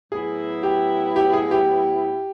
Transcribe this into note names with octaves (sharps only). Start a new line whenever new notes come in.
A2 F#3 B3 E4 G#4
G4
G4
G#4
G4